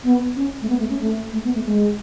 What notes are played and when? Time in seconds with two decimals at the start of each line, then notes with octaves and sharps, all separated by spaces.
0.04 B3
0.36 C#4
0.62 A3
0.68 B3
0.79 A3
0.90 C#4
1.01 A3
1.33 A3
1.44 B3
1.54 A3
1.65 G#3